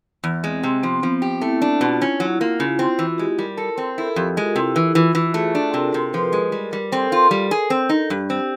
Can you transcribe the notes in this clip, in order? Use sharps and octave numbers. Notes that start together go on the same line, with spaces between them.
E2
G#3 C4
C3 C4
F3 B3
F3 B3
G4
A3 E4
D4
B2 F4
C#4 E4
F#3 E4
A#3 F#4
C#3 F4
C4 F4
E3 F#4
G#3 G4
G3 A#4
A4 A#4
C4 A#4
E4 A4
F2 G4
G#3 F4
C3 E4
E3 E4
E3 F4
E3 F#4
A3 G#4
D4 A4
C3 A#4
C3 A#4
F3 B4
G#3 B4
G3 A#4
G3 A#4
C4 A4
F4
G3
G#4
C4
D#4
G2 G4
C4